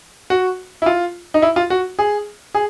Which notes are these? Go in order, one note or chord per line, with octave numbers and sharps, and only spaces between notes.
F#4
E4
F4
D#4
E4
F4
F#4
G#4
G#4